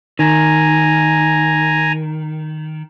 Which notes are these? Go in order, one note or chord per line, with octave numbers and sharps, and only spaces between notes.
D#3 G#5 A#5